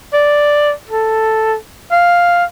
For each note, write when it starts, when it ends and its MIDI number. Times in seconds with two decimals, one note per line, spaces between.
0.13 0.71 74
0.89 1.55 69
1.91 2.44 77